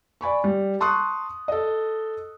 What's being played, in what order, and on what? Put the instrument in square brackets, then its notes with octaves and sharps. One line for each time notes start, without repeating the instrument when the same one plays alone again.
[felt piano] D5 G#5 B5 C#6
G3
A5 C6 C#6 D#6 F#6
A4 D#5